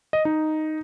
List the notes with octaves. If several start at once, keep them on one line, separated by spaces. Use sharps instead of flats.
D#5
D#4